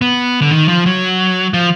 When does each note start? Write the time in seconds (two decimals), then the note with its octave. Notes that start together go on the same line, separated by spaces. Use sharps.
0.01 B3
0.42 D3
0.51 D#3
0.68 F3
0.86 F#3
1.54 F3